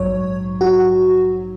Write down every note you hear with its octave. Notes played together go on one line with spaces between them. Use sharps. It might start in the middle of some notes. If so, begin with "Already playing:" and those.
Already playing: A#1 G#2 F#3 C#5
F#4